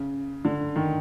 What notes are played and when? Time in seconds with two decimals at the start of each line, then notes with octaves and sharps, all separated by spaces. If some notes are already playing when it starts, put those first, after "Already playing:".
Already playing: C#3
0.45 D3
0.76 D#3